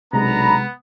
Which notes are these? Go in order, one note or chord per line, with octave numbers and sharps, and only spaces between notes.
B1 C3 G#3 B3 D4 A#5 B5